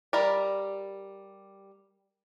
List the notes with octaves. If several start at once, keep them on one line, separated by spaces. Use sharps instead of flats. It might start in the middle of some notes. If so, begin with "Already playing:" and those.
G3 A#4 D5